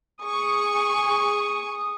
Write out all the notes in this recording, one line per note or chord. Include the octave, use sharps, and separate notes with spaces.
G#4 C#6 D#6